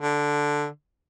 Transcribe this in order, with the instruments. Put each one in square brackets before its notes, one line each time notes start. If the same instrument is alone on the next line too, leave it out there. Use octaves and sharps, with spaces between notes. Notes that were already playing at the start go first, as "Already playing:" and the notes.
[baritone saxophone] D3